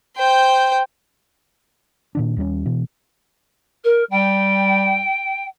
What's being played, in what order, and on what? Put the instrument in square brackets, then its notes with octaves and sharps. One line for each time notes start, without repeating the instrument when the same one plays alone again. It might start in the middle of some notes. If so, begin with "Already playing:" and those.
[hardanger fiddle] C5 G5
[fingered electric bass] A#2 D#3 D4
D#2 G3 B3 C#4
B2 E3
[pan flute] A#4
[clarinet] G3 [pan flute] G5